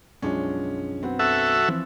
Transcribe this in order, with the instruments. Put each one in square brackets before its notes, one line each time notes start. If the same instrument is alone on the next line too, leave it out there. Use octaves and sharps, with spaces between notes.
[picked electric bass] B1 F#2 D4 [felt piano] F3 G#3 C#4
[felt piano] F#3 B3 C4
[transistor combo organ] F#4 A4 E5
[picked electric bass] E3 F3 C4